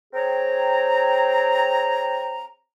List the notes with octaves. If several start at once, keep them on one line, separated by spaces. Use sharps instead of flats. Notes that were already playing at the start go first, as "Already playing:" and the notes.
C4 G#4 C#5 G5 A#5